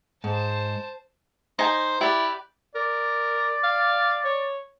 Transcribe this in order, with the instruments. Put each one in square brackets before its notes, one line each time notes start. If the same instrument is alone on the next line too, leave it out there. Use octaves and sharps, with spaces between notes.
[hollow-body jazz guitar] G#2 [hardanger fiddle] C5 A5
[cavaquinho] D#4 G#5 [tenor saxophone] C5
[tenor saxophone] E4 [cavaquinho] G4 B4 D5
[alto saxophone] A#4 [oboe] D5
[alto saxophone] F5
C#5